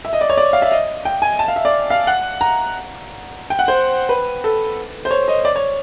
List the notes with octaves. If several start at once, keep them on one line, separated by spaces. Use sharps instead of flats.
E5
D#5
D5
C#5
D5
F5
E5
D#5
G5
G#5
A5
F5
E5
D5
F5
F#5
A#5
G5
F#5
C5
B4
A4
C5
C#5
D#5
D5
C#5